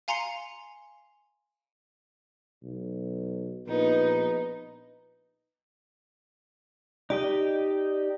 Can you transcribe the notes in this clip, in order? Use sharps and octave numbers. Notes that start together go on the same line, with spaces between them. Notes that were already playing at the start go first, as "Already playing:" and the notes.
F5 G#5 A#5 C6 C7 C#7
B1
A#1 B3 D#4
D#4 G4 D5 D#5